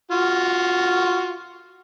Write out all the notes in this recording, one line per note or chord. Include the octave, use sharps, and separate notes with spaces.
F4 F#4